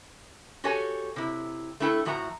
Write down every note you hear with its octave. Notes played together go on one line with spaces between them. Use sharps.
F#4 G4 A4 C#5 G#5
C3 E4
A3 D4 E4 A4 G5
A2 F3 F#4 E5 G#5 A#5